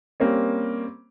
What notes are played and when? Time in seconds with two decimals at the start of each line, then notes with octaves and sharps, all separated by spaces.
0.20 G3 A#3 C4 C#4